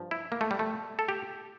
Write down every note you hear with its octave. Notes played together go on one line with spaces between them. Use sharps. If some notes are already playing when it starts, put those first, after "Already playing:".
Already playing: G2 F3
E4
A#3
A3
G3
A3
A4
G4